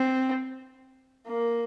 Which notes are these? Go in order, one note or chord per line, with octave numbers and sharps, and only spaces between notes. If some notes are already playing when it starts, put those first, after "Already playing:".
Already playing: C4
A#3